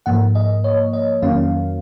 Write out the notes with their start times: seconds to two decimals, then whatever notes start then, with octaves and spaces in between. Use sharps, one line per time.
0.06 G#2 F3 A#3 F#5
0.35 D#5
0.64 C#5
0.93 D#5
1.22 F2 D#3 F#3 A#3 C#4 F5